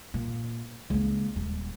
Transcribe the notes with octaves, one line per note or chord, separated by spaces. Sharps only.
A#2
C#2 A#3
D#1